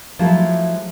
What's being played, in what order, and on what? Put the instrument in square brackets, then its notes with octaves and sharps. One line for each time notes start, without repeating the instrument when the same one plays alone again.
[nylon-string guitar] F3 F#3 G#3 A3 E4